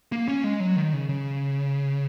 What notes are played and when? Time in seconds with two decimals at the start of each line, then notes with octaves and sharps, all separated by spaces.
0.12 A#3
0.28 C#4
0.44 G#3
0.60 F#3
0.76 D#3
0.93 C#3
1.09 C#3